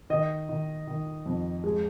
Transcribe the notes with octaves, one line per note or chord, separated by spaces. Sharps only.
D#3 D#5
D#3
D#3
F2
G#3